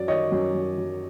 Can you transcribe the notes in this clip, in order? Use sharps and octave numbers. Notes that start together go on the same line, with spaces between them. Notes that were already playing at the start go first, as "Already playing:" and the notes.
Already playing: F#2 F#3 D5
D#3 C#5 D#5
F#2
F#2
F#3